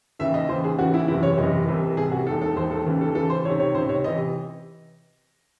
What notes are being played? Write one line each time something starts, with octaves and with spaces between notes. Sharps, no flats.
D#2 C#3 E3 E5
D#5
D#2 C#3 E3 C5
G#4
D#2 C#3 E3 F#4
E4
F#1 E2 C3 E3 E4
C#5
F#1 E2 C3 E3 D#5
C2 C3 E3
C2 C3 E3 G#4
F#4
E1 D#2 D#3 A4
A4
E1 D#2 D#3 C5
A4
D#2 C#3 E3
A4
D#2 C#3 E3 A4
C5
C#2 C3 D#3 C#5
C#5
C#2 C3 D#3 C5
C#5
C3 E3 D#5